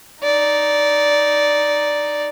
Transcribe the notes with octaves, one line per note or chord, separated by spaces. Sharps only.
D#4 D5